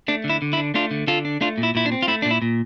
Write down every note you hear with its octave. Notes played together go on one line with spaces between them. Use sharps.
A3 D4
D3
E4
D3
E4
D4
A3 D4 F4
D3
D3 F4 A4
D4
A3 D4 F4
A#2
E4
A#2 E4
D4
C4
F4
A3 E4
D4
A#2
E4
A#2